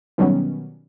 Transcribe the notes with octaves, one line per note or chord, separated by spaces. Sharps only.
B2 D#3 F#3 G3 B3 C#4